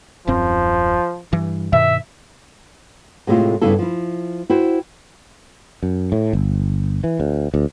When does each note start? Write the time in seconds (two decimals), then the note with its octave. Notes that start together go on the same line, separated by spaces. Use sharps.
0.27 D#1 F#2 F3 C4
1.33 G2 E3
1.73 G2 B2 D#3 E5
3.27 A2 C3 G#3 A3 E4 F4
3.62 G2 C#3 B3 E4 A4
3.79 F3 E4
4.50 E4 F#4 C5 G5
5.83 F#2
6.12 A2
6.33 G1
7.04 E3
7.20 D2
7.54 D2